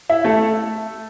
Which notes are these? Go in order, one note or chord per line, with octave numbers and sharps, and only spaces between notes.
E4 E5
A3 A4